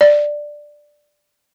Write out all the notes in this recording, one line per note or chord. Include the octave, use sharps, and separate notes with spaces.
D5